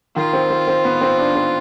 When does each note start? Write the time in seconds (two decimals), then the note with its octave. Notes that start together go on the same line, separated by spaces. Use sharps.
0.16 D#3 F4
0.33 C4
0.50 C4
0.68 C4
0.85 B3
1.01 C4
1.19 D4
1.35 C4